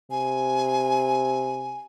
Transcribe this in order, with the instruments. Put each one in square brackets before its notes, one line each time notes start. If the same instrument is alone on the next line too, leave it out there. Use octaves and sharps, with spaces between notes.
[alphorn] C3 [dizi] G#5